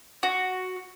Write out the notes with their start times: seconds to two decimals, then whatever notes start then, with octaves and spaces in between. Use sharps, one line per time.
0.23 F#4